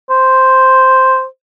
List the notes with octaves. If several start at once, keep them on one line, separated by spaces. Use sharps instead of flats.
C5